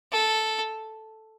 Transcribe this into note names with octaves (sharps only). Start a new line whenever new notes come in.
A4